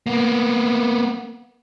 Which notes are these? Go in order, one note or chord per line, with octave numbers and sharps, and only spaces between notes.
A#3 B3